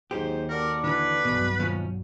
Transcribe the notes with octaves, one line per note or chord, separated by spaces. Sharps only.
D#2 G#2 F#3 G4 C5
F#4 A4 A#4 D5
D3 E3 B4
B1 E2 G2 B2 F#3
D#2 F3 C#4